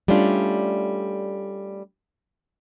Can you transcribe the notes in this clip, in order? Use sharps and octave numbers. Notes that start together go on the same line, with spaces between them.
G3 A3 C#4 D4 F4